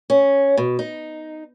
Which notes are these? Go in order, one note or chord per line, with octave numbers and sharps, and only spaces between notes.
C#4
B2
D#4